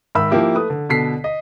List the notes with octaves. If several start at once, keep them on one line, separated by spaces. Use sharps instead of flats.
G#2 D#3 E5 B5 E6
F3 A#3 E4 G4
A3 B4 D#6
D3
B2 D3 A4 B6 C7
D#5